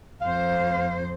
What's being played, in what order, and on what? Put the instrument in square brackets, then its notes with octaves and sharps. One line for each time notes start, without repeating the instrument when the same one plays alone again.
[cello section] F2 C5 [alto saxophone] F5